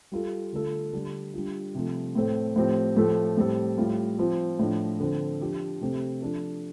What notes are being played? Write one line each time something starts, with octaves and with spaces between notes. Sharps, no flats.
G3 F4 A4
D3 A3 D4 F4 A4
D3 G3 D4
G3 D4 F4
C3 F3 A3
A2 A3 C4 A4
A2 F3 C4 G4
A2 F3 A3 C4 A4
A2 G3 C4 A4
A2 G3 F4
F3 C4 F4
A2 F3 D4
D3 F3 C4
F3 D4 G4
C3 A3 C4 G4
F3 D4 A4